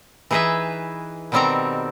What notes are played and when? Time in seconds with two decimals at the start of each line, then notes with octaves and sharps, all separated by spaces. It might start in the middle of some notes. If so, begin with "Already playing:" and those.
0.31 E3 D#4 G#4 B4 D#5 E5
1.32 B2 D#3 G3 C4 A4 A#5